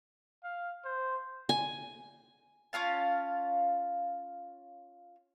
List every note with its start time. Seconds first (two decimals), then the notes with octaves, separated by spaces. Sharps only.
0.43 F5
0.85 C5
1.49 G#5
2.73 C#4 F4 F5 A5